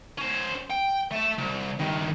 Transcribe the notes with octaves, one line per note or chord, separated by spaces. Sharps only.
C#4 C5
G5
A3 E5
C2
G2 D#3